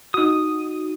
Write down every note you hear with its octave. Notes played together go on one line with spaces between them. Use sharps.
D#4 F#4 D#6